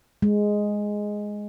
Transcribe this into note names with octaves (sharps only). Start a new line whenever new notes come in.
G#3